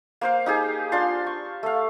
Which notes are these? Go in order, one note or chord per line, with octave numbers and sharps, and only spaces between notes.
A#3 C5 F5
D#4 G4 G#4
D4 F4 A5 C6
C#6
A3 F5